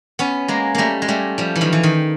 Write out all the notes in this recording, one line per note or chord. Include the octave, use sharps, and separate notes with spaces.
B3 C#4
G#3 A#3
G3 A3 A#3
G#3
G3 A3
F3 G3
E3
D#3 F3
E3
D#3